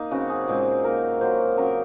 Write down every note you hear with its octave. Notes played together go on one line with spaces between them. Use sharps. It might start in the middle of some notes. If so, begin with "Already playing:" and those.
Already playing: A#3 D#4
C#3 F#3 C4 F#4
G#4
A#2 G#3 C4
D#3 A#3 A#4
D#3 F#3 A#3 C5
C#3 F#3 C4 A#4